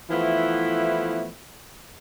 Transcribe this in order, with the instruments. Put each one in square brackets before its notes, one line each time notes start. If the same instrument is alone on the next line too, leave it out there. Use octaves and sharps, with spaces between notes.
[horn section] E3 F3 A3 B3 E4